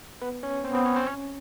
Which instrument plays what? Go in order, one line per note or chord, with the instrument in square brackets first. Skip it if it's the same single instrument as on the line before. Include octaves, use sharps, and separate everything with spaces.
[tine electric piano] B3 B4
C#4 C#5
[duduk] B3 [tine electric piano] C4 C5
[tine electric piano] C4 C5
C#4 C#5
C4 C5
C#4 C#5